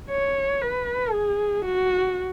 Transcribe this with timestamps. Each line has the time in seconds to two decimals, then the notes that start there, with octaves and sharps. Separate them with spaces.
0.10 C#5
0.61 B4
1.13 G#4
1.65 F#4